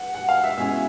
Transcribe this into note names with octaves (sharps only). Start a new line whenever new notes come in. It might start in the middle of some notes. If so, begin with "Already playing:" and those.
Already playing: F#5
F#5
F5
E5
B2 G#3 C#4 E4 E5